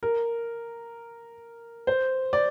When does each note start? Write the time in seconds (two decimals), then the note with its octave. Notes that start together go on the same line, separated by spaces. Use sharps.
0.03 A#4
1.87 C5
2.33 D5